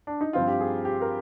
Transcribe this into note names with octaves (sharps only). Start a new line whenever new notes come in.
D4
D#4
G2 F3 C4 F4
G4
G#4
G4
A#4